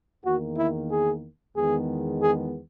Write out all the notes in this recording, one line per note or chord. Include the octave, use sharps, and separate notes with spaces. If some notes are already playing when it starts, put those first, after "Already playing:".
E2 D#3 A#3 F#4
E4
G#4
E2 D#3 G#3 B3 G#4
G#4